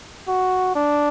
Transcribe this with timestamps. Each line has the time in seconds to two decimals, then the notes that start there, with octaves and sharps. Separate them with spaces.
0.28 F#4
0.75 D4